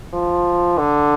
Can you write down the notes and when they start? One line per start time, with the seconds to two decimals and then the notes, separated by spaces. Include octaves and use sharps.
0.13 F3
0.78 D3